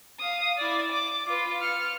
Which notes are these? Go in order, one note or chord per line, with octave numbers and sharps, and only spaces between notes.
F5 D#6
E4 D5
D6
F4 B4
F6 C#7